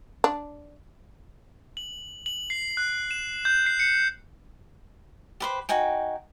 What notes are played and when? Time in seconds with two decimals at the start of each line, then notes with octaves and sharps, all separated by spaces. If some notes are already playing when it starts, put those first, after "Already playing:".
0.24 D4
1.77 F#7
2.26 F#7
2.50 C7
2.77 F#6
3.11 E7
3.45 G6
3.66 C7
3.80 C#7
5.40 G4 B4 C5
5.69 D#4 F#4 G5 G#5